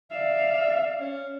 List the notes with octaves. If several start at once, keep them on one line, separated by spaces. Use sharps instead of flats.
D5 E5 F5
C#4